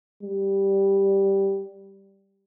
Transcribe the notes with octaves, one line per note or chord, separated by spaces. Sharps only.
G3